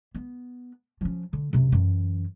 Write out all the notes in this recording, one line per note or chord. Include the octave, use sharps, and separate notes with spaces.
B3
F3 C#4
D3
F#2 C3
F#2 E3